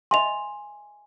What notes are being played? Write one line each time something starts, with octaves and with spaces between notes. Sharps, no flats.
D#5 E5 G#5 C6 F7